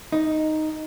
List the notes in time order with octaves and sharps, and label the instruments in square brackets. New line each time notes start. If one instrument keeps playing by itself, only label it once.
[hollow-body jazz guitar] D#4